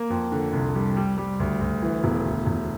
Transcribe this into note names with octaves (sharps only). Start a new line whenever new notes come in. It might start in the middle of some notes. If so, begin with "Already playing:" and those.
Already playing: A#3
F2
D3
C2
G3
G3
G3
D2
D2
E3
E1
D2
E1